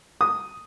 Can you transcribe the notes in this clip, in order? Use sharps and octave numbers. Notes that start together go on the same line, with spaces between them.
D#6